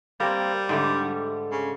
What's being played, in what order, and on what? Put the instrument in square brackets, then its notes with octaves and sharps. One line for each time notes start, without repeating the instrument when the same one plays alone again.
[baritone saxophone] G3 [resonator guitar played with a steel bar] A#3 C4
[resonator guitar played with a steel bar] G#2 D3 A3
[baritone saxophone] C#3